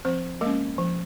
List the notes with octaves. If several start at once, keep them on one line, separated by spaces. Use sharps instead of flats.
F3 C4 C5
G#3 A#3 C#4 A#4
F3